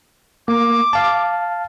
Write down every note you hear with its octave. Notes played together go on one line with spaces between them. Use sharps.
A#3 D6
F5 A5